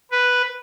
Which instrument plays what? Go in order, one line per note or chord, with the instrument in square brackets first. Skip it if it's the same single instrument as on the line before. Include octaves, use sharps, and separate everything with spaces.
[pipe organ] B4